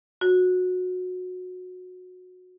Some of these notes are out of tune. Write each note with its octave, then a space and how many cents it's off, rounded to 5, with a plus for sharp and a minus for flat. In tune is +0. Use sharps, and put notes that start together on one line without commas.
F#4 -20